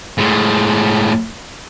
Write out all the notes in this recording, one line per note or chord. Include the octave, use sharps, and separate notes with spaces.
A2 G#3